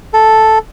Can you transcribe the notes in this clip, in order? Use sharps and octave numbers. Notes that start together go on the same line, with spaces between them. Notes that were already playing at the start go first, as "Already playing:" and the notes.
A4